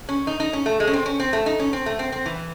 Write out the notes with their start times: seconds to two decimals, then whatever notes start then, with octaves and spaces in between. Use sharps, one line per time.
0.09 C#4
0.27 D#4
0.40 D#4
0.53 C#4
0.66 A3
0.80 G#3
0.87 C#4
0.93 C4
1.06 C#4
1.20 C4
1.33 A3
1.46 D#4
1.60 C#4
1.73 C4
1.86 A3
1.99 C4
2.12 C4
2.26 E3